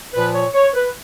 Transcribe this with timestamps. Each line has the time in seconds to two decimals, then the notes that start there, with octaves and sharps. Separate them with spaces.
0.13 A#2 F3 B4
0.33 C#5
0.54 C#5
0.74 B4